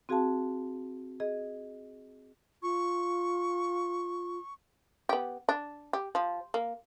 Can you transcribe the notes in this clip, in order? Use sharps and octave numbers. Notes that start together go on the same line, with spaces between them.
C4 F#4 G#4 F5 G5 A5
G#4 D#5
F4 C#6
B3 G4
D4
G4
F3
A#3